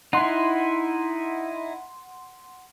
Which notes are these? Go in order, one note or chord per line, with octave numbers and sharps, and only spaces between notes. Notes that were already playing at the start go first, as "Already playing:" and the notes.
D#4 E4 F#5 C6